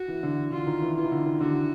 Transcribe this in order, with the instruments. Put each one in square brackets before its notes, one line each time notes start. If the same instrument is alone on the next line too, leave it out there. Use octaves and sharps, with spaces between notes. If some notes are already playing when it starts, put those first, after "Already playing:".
Already playing: [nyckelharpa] F#4
[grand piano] E3
D3
[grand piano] D3 [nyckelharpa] F4
[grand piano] D#3
E3
[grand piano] E3 [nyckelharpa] F4
[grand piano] D#3
D3
D#3
[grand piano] D3 [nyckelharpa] F#4